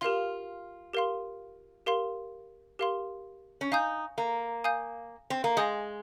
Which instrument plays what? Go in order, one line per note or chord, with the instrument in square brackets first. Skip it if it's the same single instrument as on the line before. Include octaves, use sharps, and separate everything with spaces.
[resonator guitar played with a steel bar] F4 [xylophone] G4 A#4 F5 C6
[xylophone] G4 A#4 F5 C6
G4 A#4 F5 C6
G4 A#4 F5 C6
[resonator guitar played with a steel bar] C#4
[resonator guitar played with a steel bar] D#4 [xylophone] F5 G#5 D#6 G6
[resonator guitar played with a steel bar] A#3
[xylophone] F5 G#5 D#6 G6
[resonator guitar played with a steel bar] C4
A#3
[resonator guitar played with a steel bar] G#3 [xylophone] F5 G#5 D#6 G6